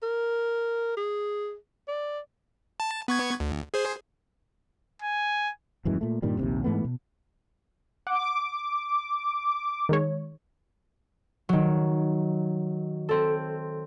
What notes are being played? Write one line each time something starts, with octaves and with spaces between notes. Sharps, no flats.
A#4
G#4
D5
A5
B3 C#6 G#6
D2
G#4 C5
G#5
D#1 F#2 E3 G#3
A#2 A3
G2 A#2 D#3 G3
A#1 D#2 C3
G#2 E3 A3 B3
B2
F#5 D6
D#3 G#3 C#5
D#3 F#3
C4 A4